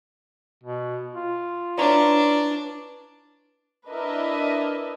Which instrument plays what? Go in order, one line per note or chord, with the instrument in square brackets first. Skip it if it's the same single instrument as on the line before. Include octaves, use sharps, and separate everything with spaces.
[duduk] B2
F4
[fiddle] D4 [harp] E4 B4 C#5 [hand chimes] D5 A#5
[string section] D4 E4 A#4 B4 D#5 E5